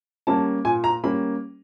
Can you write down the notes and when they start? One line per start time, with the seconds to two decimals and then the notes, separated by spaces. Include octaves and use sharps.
0.27 G3 A#3 C#4 A5
0.65 A#2 G#5
0.84 A#5
1.04 G3 A#3 C#4 B5